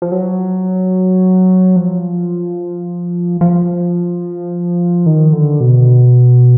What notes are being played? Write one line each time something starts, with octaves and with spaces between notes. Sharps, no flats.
F3
F#3
F3
F3
D#3
D3
B2